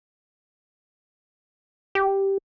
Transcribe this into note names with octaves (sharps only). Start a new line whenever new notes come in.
G4